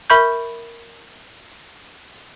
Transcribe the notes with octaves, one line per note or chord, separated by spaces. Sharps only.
A#4 E5 B5 C#6 G6